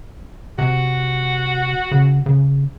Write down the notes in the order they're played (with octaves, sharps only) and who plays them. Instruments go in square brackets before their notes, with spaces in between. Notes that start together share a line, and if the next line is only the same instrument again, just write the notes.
[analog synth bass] C3 [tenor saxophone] F#4
[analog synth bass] C#3
C#3